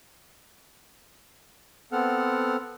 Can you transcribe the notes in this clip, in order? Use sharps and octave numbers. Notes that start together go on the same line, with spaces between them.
B3 C4 A4 F#5 F6